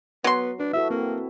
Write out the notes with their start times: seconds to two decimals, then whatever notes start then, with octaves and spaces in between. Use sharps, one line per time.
0.24 F#3 B3 C6
0.60 D4 B4
0.73 E4 F#4 A4 E5
0.90 A#3 C4